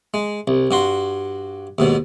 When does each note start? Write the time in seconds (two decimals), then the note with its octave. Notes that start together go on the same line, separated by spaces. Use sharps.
0.14 G#3
0.48 C2
0.71 G2 F#4 C6
1.78 D#2 G#2 B2